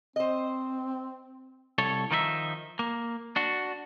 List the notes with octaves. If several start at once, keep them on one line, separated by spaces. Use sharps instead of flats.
C4 C5 D#5
C2 A4 C#5
D#3 F3 D#4 G#4 E5
A#3
D4 F#4